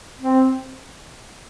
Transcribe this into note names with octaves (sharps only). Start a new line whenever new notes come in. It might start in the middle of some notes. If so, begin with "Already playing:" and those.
C4